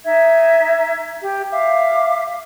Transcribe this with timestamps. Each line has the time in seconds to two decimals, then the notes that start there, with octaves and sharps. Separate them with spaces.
0.04 D#4 E5 G#6
1.20 G4
1.51 E5 F5 D6